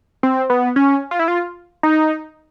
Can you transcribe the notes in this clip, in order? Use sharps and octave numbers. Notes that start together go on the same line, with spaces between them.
C4
B3
C#4
F4
E4
F4
D#4